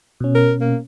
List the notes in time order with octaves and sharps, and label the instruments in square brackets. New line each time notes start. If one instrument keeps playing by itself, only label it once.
[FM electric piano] B2 C#4
[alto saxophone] A#4
A#3